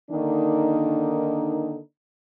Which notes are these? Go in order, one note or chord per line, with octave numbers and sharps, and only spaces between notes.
D3 D#3 A#3 D4 D#4